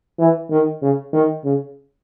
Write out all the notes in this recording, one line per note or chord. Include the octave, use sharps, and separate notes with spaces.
E3
D#3
C#3
D#3
C#3